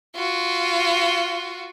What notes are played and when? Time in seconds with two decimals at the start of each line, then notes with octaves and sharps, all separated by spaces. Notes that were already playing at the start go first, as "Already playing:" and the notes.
0.16 F4 F#4